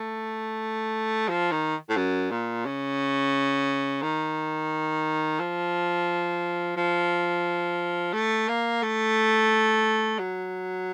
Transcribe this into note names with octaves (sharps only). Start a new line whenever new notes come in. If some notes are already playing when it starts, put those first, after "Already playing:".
Already playing: A3
F3
D#3
A2
F#2
A#2
C#3
D#3
F3
F3
A3
A#3
A3
F#3